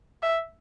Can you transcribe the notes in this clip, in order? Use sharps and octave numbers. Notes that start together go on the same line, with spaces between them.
E5